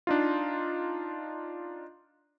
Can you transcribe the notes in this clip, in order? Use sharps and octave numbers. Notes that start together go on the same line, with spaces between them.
D4 D#4 F4